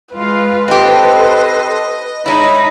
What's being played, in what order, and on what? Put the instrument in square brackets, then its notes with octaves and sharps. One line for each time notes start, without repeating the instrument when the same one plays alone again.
[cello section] G#3 F4 F5 [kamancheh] B4
[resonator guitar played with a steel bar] C4 G4 [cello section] A4 C5 [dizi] D#5
[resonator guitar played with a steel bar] G#3 E4 [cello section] D#4 [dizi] C#5 [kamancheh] B5